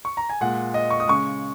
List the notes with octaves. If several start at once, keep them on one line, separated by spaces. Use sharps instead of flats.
C#6
A#5
G#5
A#2 G#3 F#5
D#5
C#6
D#6
C#3 G#3 C#6